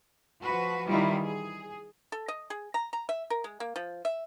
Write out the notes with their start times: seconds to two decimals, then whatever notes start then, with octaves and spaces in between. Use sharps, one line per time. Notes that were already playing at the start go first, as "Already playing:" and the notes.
0.42 F3 F#4 B4
0.88 D#3 E3 G3 E4 F4
1.25 G#4
2.12 A4
2.28 D#5
2.50 G#4
2.74 A#5
2.93 A#5
3.09 E5
3.30 A#4
3.44 G#3
3.60 A#3
3.76 F3
4.05 E5